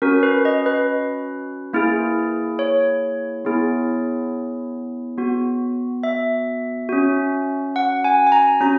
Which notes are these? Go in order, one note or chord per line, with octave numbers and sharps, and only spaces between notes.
C#4 F#4 A#4
B4
D#5
B4
A#3 E4 G#4
C#5
B3 E4 G#4
B3 F#4
E5
C#4 F#4
F#5
G#5
G#5
A#5
C#4 F#4 A#5